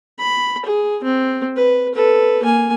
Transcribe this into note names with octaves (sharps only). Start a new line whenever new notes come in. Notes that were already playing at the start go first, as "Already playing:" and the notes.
B5
G#4
C4
B4
A4 B4
A#3 G#5